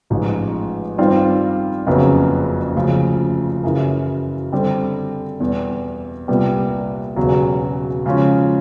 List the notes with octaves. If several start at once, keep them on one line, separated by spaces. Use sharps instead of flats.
A1 G#2 F3 G#3
G2 D#3 G3 C4 F4
F#1 F2 C#3 F#3 B3
D2 C#3 F3
F#2 C#3 E3
D3 G3 C4
E2 B2 G3
C2 A#2 G3 B3
E1 E2 C#3 F#3
C#3 F3 G#3 C#4 F4